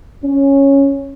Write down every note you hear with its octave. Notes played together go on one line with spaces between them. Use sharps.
C#4